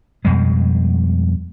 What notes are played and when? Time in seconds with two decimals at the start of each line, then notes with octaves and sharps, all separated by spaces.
0.25 F2 B2 G3 G#3